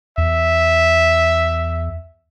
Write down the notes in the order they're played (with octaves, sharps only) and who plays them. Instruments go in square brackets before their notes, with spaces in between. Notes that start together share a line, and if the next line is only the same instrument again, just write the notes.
[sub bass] E2 [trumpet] E5